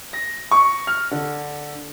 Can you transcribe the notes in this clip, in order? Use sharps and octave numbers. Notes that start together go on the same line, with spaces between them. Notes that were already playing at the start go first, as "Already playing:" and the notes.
A#6
C#6
F6
D3